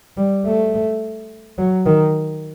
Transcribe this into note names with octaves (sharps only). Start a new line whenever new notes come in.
G3
A3
F#3
D#3